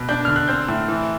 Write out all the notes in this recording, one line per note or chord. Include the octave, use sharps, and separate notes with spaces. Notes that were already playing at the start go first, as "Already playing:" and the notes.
Already playing: B2
D4 G6
D3 F6
F#6
C4 G6
A2
E3